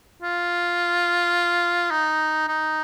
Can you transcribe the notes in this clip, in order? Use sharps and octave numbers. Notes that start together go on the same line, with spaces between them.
F4
D#4
D#4